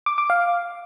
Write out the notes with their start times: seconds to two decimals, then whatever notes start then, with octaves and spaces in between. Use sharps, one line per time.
0.06 D6
0.18 D6
0.30 F5